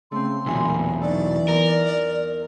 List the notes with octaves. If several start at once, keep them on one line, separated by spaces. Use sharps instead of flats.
C#3 A3 C4 C6
B1 E2 A#2 E5 G#5 B5
E3 F#3 D#4 A4 D5
E2 A#4